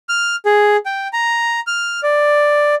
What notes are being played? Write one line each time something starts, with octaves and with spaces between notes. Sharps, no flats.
F6
G#4
G5
A#5
F6
D5